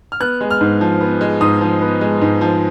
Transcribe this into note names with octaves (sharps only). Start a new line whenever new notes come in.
F6
B3 F#6
G#3
F6
G#2
F3
B3
G#3
G#2 D#6
F3
B3
G#3
G#2
F3